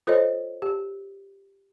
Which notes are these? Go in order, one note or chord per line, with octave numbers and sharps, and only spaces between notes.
F4 A4 C5 C#5 D#5
G4